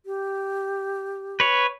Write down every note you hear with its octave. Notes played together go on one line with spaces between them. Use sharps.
G4
B4 C#5